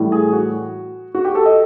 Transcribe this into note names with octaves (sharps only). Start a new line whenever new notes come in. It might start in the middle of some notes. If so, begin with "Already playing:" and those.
Already playing: A2 E3 G3
G#4
F#4
F#4
G4
A4
D#5